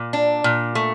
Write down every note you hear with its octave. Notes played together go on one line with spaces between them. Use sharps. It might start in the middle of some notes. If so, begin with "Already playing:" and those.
Already playing: A#2
D4
A#2
A3